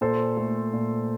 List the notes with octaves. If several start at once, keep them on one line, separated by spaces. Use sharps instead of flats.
A#2 A4 C5
A3
A#2